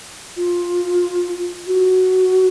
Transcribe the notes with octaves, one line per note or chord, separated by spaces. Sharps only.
F4
F#4